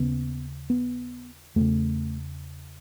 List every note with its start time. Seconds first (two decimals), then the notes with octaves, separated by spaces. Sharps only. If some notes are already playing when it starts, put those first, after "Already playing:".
Already playing: D#2 C#3 B3
0.70 B3
1.56 E2 C#3 A3